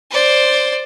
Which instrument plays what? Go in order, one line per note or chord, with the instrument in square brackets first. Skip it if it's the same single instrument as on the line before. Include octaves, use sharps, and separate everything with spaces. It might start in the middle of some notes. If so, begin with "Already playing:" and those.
[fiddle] C5 D5